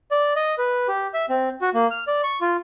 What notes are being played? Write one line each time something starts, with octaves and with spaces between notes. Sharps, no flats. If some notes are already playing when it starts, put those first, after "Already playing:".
D5
D#5
B4
G4
E5
C4
F#4
A#3
F6
D5
C#6
F4